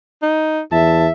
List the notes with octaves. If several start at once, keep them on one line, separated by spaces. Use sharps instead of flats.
D#4
E2 E5 A5